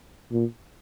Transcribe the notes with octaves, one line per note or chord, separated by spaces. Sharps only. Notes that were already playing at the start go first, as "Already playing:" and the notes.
A#2